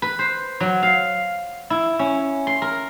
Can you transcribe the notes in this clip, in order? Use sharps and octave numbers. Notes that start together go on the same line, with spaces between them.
B4
C5
F#3
F5
E4
C#4
C6
A#4